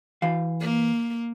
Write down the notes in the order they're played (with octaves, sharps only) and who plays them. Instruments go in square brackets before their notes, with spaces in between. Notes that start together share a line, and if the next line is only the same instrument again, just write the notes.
[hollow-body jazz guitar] E3 F5
[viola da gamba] A#3